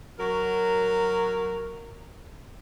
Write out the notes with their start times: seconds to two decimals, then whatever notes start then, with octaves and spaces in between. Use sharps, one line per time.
0.18 F#3 F#4 A#4